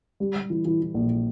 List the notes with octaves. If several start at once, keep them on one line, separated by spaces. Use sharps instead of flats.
G3
G3
E3
E3
E3
A#1